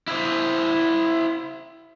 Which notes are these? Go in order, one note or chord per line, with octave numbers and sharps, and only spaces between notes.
E4 C5